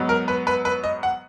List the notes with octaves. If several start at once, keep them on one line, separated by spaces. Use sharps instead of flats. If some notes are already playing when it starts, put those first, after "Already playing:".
Already playing: G#2 F#3 B3
A#4
B4
B4
B4
D#5
F#5